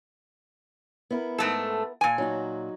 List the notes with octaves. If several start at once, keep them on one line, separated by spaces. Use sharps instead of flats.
B3 E4 A#4
G#2 A3 A4
A#2 G#5
F#3 D#4 F#4